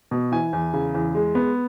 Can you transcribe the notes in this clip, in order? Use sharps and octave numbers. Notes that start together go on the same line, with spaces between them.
B2
E3 G#5
E2
C#3
E2
G#3
B3